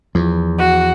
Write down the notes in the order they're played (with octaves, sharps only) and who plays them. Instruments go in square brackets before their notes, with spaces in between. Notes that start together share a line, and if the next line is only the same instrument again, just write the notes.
[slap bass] E2 [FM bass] F3
[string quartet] F#4